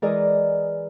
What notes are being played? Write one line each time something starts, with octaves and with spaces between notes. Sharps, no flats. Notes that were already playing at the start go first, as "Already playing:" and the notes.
E3 G#3 G#4 A#4 D5 D#5